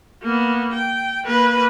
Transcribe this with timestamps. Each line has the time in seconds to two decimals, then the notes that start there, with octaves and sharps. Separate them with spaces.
0.22 A#3 B3
0.74 G5
1.25 A#3 B4